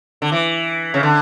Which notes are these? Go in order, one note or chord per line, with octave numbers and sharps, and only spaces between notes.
D3
E3
C#3
D3